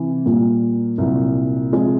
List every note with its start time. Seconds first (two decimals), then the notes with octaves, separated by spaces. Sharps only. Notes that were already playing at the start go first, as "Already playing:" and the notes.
Already playing: C3 E3
0.25 A#2 G3 A#3
0.98 C2 A#2 F#3
1.72 C3 F3 G#3